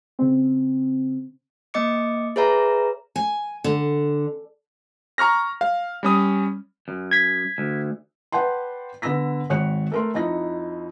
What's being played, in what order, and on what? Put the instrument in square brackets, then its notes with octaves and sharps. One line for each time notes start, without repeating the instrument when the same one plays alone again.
[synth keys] C#3 C4
[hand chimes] A#3 D#5 D6 C#7
G#4 B4 C#5 E5 A#5
[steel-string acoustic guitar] G#5
D3
[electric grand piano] A#5 C#6 F6 A#6
F5
G3 C#4 D#6
[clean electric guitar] F#2
[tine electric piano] G#6 B6
[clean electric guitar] D2
[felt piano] B4 D5 F#5 G5 A5 C6
D3 B3 E6 A#6 B6
G#1 C#5 F#6 C#7
A3 A#4 C6
F2 D#4 E4 A#6